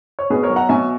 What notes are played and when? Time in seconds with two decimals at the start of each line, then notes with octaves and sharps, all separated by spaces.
0.19 C#5
0.30 B2 G#4 B4
0.43 A#4 C#5
0.50 F#3
0.56 F#5 A#5
0.69 B2 E5 G#5